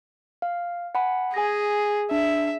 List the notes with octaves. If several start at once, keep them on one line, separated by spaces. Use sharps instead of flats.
F5
F#5 G#5 B5
G#4 G#5 A#6
D4 E5